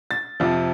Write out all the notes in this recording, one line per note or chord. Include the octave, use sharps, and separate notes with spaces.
A6
F2 C3 F3